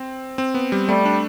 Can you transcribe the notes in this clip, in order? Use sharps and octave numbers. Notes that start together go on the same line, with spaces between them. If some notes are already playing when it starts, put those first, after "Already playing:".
Already playing: C4
C4
B3
G3
G3 A3
D4